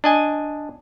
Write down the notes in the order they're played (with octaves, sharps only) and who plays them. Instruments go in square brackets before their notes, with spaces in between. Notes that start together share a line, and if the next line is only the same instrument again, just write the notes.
[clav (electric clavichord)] D4 D#5 G#5